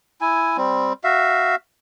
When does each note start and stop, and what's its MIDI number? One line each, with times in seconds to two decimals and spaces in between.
0.21 0.57 64
0.21 0.57 80
0.57 0.93 55
0.57 0.93 60
1.04 1.56 66
1.04 1.56 76
1.04 1.56 77